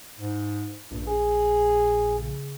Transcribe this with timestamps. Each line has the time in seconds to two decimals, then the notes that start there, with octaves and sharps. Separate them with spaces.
0.19 G#2
0.91 A#1 G2
1.07 G#4
2.18 C#3